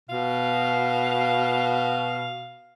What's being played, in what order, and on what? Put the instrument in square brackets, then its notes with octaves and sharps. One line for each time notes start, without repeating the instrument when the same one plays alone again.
[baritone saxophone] B2 [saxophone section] F5